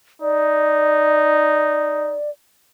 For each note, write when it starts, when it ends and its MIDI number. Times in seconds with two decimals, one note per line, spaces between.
0.22 2.17 63
0.22 2.30 74